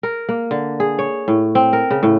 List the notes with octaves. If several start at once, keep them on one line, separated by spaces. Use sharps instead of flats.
A#4
A#3
D3
G#4
C#5
A2
C4
A#4
C#3
A2